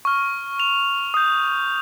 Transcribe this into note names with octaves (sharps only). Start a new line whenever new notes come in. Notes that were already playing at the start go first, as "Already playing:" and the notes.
C#6 F6
F7
D#6 G6